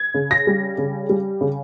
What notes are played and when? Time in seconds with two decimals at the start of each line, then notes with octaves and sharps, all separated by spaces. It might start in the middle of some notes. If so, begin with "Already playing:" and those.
Already playing: G#6
0.14 C#3
0.31 A#6
0.47 G3
0.78 C#3
1.09 G3
1.41 C#3